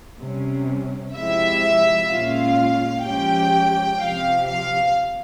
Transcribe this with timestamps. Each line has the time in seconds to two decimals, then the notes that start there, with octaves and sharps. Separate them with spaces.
0.20 C3 G3 C#4
1.15 C3 F3 G#3 E4 G4 E5
2.10 A#2 G#3 C#4 F4 F5
3.05 F3 G#3 C#4 G4 G5
4.00 C3 F3 C4 G4 F5
4.48 F5